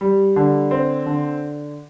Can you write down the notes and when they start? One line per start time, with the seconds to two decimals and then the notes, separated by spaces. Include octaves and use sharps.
0.01 G3
0.36 D3
0.71 C4
1.06 D3